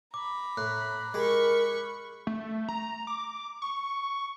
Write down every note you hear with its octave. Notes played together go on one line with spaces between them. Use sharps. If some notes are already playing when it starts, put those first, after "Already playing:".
A#5 B5 D6
A2 F#6
G#3 G4 A#4 B5 C#6
A3
A#5
D6
C#6